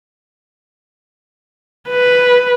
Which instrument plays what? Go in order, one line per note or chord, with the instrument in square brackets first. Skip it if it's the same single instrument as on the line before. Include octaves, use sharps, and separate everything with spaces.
[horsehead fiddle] B4